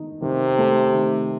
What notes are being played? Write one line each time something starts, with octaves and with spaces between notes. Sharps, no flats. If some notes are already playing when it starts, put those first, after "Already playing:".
Already playing: D#3 D#4
C3 D#3
A3
D#3